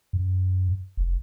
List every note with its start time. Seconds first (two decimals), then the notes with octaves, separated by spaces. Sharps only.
0.13 F#2
0.97 F1